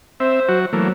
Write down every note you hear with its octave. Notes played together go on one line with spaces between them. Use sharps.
C4 C5 E5
F#3 F#4
E3 F#3 A3 A#3